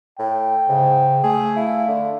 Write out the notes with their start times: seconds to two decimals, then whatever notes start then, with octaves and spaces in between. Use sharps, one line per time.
0.19 A2 G5
0.69 G#2 C#3
1.24 A3 G#4
1.57 E4 F5
1.88 D3